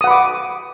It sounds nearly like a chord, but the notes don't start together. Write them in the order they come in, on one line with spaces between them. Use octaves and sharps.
D#6 F#5 B5 D6